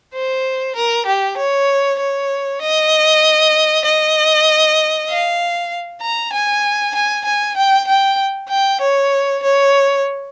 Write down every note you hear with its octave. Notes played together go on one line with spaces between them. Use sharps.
C5
A#4
G4
C#5
C#5
D#5
D#5
F5
A#5
G#5
G#5
G#5
G5
G5
G5
C#5
C#5